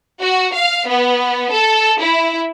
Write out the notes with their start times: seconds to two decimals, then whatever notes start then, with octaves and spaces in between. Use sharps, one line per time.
0.22 F#4
0.54 F5
0.88 B3
1.53 A4
2.01 E4